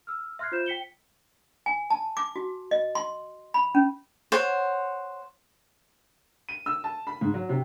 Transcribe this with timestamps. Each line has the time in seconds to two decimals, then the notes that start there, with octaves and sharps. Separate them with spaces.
0.07 E6 F6
0.39 E5 C6 F6 F#6 G#6 C7
0.52 F4 C5 G6 E7
0.66 G5 B6 C#7 G7
1.66 G#5
1.90 A5
2.17 D6
2.36 F#4
2.71 D#5
2.95 C6
3.54 B5
3.75 C#4
4.32 C5 C#5 F#5
6.49 D#7
6.66 E6
6.84 A5
7.07 B5
7.21 G#2
7.34 F#3
7.49 C3